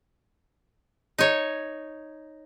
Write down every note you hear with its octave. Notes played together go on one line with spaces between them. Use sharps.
D#4 C#5